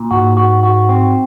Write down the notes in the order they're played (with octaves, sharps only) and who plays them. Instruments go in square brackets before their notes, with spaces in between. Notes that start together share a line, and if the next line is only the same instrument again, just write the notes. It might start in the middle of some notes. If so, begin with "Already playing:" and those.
Already playing: [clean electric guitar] A#2
[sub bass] G#2 [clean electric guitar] F#4
[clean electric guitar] F#4
F#4
C4